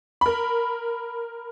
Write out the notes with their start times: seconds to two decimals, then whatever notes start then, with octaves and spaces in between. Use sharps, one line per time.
0.21 A#4 B5